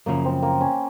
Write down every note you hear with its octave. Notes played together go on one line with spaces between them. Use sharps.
F#2 C#3 F3 A#3
C4
A#3
C#4